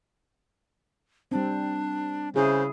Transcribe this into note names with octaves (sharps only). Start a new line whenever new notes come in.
G3 C4 D4
C#3 E4 G#4 C5